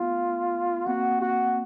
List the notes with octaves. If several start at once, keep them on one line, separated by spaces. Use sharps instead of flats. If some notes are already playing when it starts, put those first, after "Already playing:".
Already playing: A3 B3 F4
A#3 C4 F#4
F#4